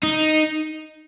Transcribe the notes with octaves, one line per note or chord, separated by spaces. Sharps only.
D#4